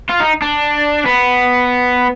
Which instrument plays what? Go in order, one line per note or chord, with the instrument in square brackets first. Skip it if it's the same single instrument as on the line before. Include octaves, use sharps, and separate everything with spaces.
[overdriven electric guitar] F4
D#4
D4
B3